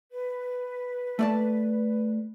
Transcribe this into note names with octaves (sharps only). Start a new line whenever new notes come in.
B4
A3 D5 A5